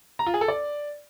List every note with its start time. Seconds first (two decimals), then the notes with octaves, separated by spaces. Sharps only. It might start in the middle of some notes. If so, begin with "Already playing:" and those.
0.19 A#5
0.27 F4
0.34 G#4
0.41 A4
0.48 D5